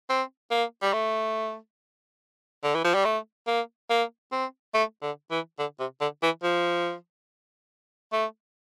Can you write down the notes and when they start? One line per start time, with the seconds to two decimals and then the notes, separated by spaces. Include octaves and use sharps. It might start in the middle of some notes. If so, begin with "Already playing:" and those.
0.10 C4
0.51 A#3
0.82 G3
0.93 A3
2.64 D3
2.75 E3
2.85 F3
2.95 G3
3.05 A3
3.47 A#3
3.90 A#3
4.32 C4
4.74 A3
5.02 D3
5.31 E3
5.59 D3
5.79 C3
6.01 D3
6.23 E3
6.43 F3
8.13 A3